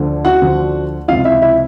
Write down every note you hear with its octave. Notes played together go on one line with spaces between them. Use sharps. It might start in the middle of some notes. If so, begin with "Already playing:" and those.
Already playing: D2 D3 F3
F#4 F#5
D2 D3 F3
C#2 C3 F3 F4 F5
E4 E5
E4 E5